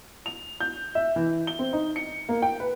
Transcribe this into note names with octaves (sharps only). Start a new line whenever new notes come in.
F7
G6
E5
E3
G7
C4
D#4
C#7
A#3
G5
B4